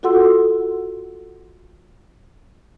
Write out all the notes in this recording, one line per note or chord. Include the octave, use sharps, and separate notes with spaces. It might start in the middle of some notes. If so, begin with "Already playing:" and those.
F4 F#4 A4 F#5 C6 E6